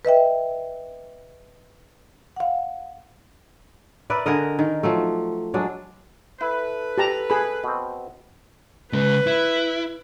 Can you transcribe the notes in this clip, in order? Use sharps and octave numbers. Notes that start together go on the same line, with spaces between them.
B4 D#5 E5 G5
F5 F#5
A#4 B4 D5 E5
D3 G#4 A#4 D#5
D#3
F3 F#3 A3
F#3 G#3 D4
E4 A4 B4
G4 A5 A#5
G#4 B5
B2 C4
C#3 G#3 B4
E4